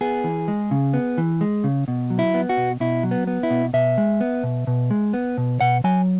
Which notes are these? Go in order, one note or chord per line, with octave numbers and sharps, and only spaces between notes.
B3 G#4
E3
G#3
C#3
B3
E3
G#3
C#3
B2
F#3
E4
B3
F#4
B2
B2 E4
F#3
B3
B3
E4
B2
B2 E5
G#3
B3
B2
B2
G#3
B3
B2
B2 F#5
F#3 G#5